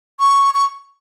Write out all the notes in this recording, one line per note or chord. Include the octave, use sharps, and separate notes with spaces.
C#6
C#6